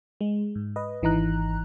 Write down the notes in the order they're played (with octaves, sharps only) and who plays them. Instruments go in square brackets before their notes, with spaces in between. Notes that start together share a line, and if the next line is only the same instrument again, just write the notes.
[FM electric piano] G#3
G#2
B4 D#5
G#1 E3 D#4 A#5 F#6